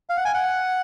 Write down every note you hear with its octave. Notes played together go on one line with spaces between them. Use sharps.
F5
F#5
G#5
F#5